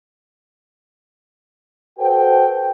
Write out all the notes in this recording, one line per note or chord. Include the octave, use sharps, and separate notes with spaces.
F#4 A4 B4 C5 G5